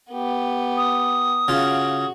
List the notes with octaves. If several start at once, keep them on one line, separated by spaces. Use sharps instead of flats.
B3 G4
D#6
C#3 F4 F#4